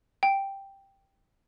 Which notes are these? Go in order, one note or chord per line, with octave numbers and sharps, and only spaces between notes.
G5